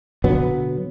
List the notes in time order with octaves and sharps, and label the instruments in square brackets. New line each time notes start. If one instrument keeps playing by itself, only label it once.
[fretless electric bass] B2 D3 F#3 B3